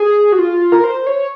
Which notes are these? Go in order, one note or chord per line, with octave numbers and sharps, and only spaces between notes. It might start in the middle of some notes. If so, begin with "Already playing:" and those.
Already playing: G#4
F#4
F4
A#4
C5
C#5